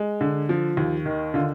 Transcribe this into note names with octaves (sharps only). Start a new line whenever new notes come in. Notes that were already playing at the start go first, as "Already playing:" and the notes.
Already playing: G#3
D3
F3
D#2
D#3
D3 F4